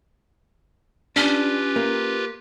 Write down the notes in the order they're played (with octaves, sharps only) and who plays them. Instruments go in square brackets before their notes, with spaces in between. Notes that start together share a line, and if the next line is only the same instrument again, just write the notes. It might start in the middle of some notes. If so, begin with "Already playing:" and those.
[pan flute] C#4 [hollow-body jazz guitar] D4 [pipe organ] F4 G4 B4
[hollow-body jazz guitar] A#3